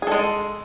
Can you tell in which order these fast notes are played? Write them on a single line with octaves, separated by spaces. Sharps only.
G#4 A4 G#3